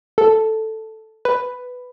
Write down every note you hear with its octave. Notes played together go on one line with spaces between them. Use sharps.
A4
B4